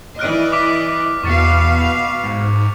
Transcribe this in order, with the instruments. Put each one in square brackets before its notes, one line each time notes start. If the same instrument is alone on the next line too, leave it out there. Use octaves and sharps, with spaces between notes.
[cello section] E3 D5 D#5 [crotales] F6 F#6 D7
[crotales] D6 B6
[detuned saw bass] E2 [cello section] B2 B3 F5 [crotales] C#6 A6 C#7
[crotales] F7
[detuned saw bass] G#2